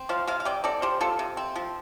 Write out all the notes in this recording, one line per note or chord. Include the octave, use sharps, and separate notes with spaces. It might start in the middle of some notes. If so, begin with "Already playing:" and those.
Already playing: C4
F3 C5 F5
C3 C5 F5
F5
C3 D5 G5
C4 A4 D5
F3 G4 C5
C3 F4 A4
C3
C4
F3